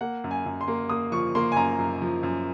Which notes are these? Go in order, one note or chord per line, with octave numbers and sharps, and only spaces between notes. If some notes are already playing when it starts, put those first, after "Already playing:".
A#3 F#5
F#2
G#5
F#2
C6
A#3
A#3 D#6
F3 C#6
A#3 C6
G#5
F#2 A#5
F#2
F3
F#2